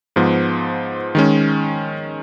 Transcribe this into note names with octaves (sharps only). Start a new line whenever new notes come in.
G#2 F3 B3
D#3 G#3 C#4